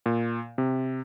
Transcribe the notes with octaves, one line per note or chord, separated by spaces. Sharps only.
A#2
C3